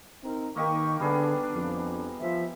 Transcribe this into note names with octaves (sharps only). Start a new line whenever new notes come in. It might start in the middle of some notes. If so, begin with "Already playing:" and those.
C4 D#4 A#4
D#3 A#3 D#4 G4 C#6
D3 G3 B3 D4 G#4
F2
F3 E5